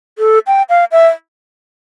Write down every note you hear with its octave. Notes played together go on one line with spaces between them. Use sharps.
A4
G5
F5
E5